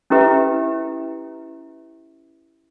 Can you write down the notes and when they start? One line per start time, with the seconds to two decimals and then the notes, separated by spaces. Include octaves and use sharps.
0.10 C#4 E4 G4 B4 E5